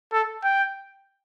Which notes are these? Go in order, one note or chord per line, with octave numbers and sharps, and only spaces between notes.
A4
G5